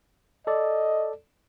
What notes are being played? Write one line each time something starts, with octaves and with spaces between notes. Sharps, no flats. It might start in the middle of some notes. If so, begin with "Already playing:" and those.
A4 D5 D#5